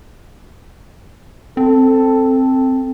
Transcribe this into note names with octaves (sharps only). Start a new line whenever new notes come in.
C4 A4